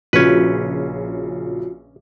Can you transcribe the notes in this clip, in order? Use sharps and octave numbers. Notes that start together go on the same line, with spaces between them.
A#1 C#3 C#4 F4 F#4 B4